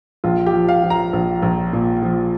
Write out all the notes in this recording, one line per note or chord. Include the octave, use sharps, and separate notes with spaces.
A#1 F4
G4
F3
F5
F3
A#5
A#1
A#1
A#2
F3